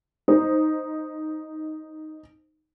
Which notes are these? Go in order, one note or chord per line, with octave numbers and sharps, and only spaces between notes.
D#4 C5